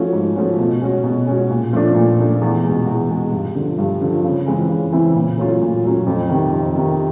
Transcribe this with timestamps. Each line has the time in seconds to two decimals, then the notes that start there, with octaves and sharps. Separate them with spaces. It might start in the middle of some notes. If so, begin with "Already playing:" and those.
Already playing: F3 A3 C#4 F#4
0.13 G#2
0.36 F3 A3 C#4 F#4
0.59 B2
0.81 G#3 C#4 F#4
1.04 B2
1.27 G#3 C#4 F#4
1.51 A#2
1.73 F3 A3 D4
1.95 A#2
2.19 F3 A3 D4
2.42 E2
2.64 B2 G#3
2.87 E2
3.10 B2 G#3
3.32 G2
3.55 D3 F3
3.78 G2
4.01 D3 F3
4.25 C#3
4.46 E3 G#3 C4 E4
4.70 C#3
4.92 E3 G#3 C4 E4
5.16 A#2
5.38 F#3 A3 C#4 F4
5.61 A#2
5.84 F#3 A3 C#4 F4
6.07 F2
6.30 C3 D#3
6.52 F2
6.75 C3 D#3